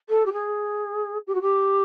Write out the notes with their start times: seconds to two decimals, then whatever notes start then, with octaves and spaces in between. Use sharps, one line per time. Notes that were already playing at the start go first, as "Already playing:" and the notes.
0.09 A4
0.26 G4
0.33 G#4
1.27 G4
1.35 F#4
1.41 G4